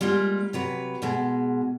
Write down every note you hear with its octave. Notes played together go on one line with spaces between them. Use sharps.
G3 G#3 A#3 F4
C3 F#3 B4
G#2 B2 G#3